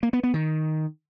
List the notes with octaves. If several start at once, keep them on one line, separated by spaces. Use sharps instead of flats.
A#3
B3
B3
D#3